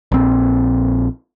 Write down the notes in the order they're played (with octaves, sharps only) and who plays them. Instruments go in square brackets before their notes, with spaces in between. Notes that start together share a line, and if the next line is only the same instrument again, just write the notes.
[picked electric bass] A#1 C4